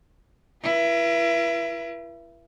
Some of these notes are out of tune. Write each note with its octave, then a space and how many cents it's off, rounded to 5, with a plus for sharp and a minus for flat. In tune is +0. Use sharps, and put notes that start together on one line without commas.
E4 +30 B4 -40